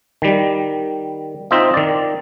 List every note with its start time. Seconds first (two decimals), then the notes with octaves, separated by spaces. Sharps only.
0.22 D#3 G3
1.51 C4 D#4 F4 C5 D#5 E5
1.74 D#3 D5